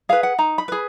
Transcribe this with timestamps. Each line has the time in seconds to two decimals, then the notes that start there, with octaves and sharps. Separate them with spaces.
0.09 G#4 B4 F5
0.23 F#5
0.38 D#4 A#5
0.58 B5
0.68 G#4 B4